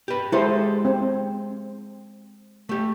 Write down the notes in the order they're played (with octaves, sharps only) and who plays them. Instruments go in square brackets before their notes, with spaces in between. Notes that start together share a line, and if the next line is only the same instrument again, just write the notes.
[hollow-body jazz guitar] G4 B4
[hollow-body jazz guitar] G#3 A4 [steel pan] E4 G4 C5
[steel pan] C4
[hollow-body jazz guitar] A3 G4